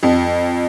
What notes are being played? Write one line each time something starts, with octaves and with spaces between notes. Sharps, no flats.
F2